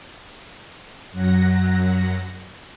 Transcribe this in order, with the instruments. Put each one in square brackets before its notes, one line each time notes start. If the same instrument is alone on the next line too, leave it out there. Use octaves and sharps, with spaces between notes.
[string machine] F#2 F#3 F#5 A#6